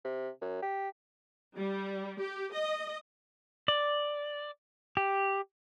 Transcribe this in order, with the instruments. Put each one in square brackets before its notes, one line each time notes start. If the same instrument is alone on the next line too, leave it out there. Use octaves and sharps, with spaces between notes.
[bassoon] C3
F#2
G4
[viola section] G3
G4
D#5
[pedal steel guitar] D5
G4